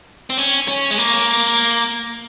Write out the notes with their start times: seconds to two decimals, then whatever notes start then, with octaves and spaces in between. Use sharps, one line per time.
0.30 C4
0.38 C#4
0.68 C#4
0.91 G#3
0.98 A#3